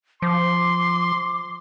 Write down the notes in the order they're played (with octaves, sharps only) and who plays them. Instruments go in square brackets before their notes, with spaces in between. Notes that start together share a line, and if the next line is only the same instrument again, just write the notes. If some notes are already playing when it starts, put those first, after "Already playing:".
[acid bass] F3 [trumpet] C6 [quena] D6